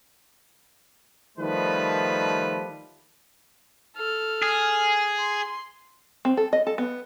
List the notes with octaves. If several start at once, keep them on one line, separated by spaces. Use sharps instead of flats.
D#3 F3 G3 A3 B4
A4 F6
G#4
C6
C4
A4
D#5
A4
B3